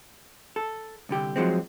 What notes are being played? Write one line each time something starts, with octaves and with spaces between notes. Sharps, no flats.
A4
C2 D3 G4
F3 F#3 G#3 C4